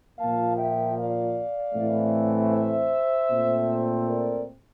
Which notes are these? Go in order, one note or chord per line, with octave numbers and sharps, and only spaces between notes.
A#2 F3 A#3 F5 A5
E5 G5
D5 F5
A2 E3 A3 C4
C5 E5
A#2 A3 C4
A#4 D5